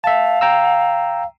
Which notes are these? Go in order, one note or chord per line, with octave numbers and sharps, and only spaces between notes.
E5 F5 A5
G5 A#5 E6